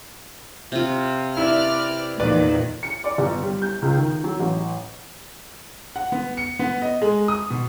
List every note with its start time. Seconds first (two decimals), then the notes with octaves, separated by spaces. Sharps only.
0.72 C3 F4
1.37 E4 B4 D5 F6
2.20 E2 A#2 D#3 B4 D5
2.83 C#7
3.04 D5
3.18 G1
3.43 G3
3.62 G6
3.82 C#2
3.97 D#3
4.24 F#3
4.40 A1
5.96 F#5
6.12 B3
6.37 C#7
6.59 B3
6.82 D#5
7.02 G#3
7.28 D#6
7.50 B2